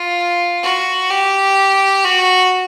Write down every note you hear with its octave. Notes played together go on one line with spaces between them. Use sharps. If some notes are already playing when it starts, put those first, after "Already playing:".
Already playing: F4
F#4
G4
F#4